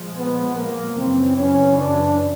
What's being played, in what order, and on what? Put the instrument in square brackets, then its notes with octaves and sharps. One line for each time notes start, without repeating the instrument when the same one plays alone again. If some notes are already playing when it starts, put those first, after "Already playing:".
Already playing: [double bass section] A#2 F3 G#3
[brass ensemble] B3
A#3
[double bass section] F#2 C#3 E3 [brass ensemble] C4
[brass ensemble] C#4
D4